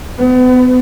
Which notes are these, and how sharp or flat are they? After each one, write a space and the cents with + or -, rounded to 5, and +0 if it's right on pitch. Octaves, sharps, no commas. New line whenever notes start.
B3 +35